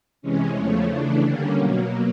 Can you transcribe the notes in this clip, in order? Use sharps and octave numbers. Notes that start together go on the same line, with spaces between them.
C3 E3 G#3 C#4
E2 C#3 F3 A3 C#4
C#3 E3 A3 D4
D3 G3 A#3 C#4
B2 F#3 A#3